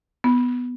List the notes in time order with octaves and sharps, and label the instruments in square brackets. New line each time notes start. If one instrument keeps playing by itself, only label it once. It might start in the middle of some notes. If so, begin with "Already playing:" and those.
[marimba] B3